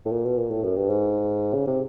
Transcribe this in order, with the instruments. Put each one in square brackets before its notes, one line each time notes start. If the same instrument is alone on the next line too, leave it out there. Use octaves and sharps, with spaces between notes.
[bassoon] A2
A#2
B2
A#2
A2
F#2
G2
G#2
C#3
C3